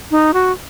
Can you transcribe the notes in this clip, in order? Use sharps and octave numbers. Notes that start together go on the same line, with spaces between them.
D#4
F#4